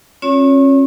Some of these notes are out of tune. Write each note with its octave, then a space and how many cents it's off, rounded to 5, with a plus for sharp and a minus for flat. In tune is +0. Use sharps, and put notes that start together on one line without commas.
C#4 -35 F4 +35 C#5 +25